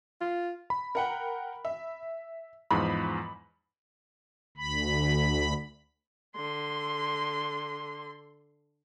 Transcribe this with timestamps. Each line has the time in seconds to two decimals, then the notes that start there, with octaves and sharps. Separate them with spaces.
0.21 F4
0.70 B5
0.95 A#4 F#5 G5
1.65 E5
2.71 E2 G#2 F3 B5
4.57 D2 B5
6.36 D3 C6